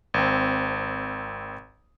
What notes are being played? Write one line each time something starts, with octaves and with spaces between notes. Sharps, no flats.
G#1 C4